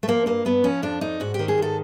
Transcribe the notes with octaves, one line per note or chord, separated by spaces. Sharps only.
A3
F3 A#3
G2 A#3
G2 B3
F3 C#4
F2 D4
F2 D#4
G#2 F#4
G4
D#3
G#4
G#2 A4